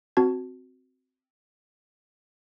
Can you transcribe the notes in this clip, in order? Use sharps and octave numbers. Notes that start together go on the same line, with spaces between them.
C4 F#4 A5 G#6